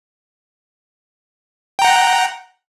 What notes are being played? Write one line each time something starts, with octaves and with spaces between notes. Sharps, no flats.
F#5 G5 A#5